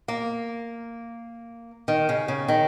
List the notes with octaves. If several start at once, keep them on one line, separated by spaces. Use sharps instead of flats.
A#3
D#3
C#3
C#3
D#3